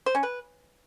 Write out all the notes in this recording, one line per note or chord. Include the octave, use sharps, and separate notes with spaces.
C5
C#4
B4